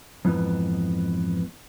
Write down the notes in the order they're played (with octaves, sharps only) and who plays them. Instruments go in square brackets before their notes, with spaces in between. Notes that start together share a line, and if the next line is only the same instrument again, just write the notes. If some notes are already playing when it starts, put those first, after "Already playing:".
[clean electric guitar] F2 G#2 E3 B3